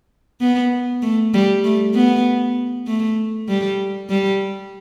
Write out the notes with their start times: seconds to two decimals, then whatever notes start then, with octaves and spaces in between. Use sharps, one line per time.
0.41 B3
1.02 A3
1.34 G3
1.64 A3
1.94 B3
2.87 A3
3.48 G3
4.10 G3